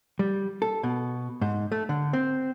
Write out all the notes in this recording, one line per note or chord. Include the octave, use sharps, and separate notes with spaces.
G3
A4
B2
G#2
A3
D3
C4